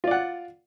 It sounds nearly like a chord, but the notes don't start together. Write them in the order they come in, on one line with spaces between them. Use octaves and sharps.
F4 D5 F#5